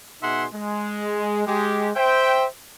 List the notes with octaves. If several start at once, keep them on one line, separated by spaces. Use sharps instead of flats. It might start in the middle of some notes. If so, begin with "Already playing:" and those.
B2 D#4 G#4 E5 F#5 C6
G#3
G#3 G4
C5 E5 G5